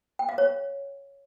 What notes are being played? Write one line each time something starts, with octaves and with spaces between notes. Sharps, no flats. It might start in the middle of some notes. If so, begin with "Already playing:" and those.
G5
F5
C#5